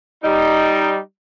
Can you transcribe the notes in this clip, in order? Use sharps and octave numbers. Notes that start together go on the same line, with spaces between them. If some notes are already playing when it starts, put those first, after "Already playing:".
G3 D#4